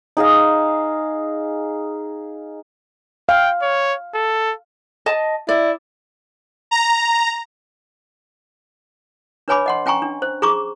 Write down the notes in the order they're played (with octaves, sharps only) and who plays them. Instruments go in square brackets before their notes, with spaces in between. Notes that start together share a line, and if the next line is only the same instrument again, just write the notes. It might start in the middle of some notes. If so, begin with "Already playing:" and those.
[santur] D#4 G#4 D#5 F5
[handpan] F5 [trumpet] G5
[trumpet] C#5
A4
[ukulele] D#5 A5
[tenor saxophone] E4 [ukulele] D5
[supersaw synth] A#5
[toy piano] D4 B4 C#5 G#5 B5 D6
D#5 F#5 C6
C#4 G5 G#5 A#5 C#6
D4
C5
G#4 A#5 C#6 D6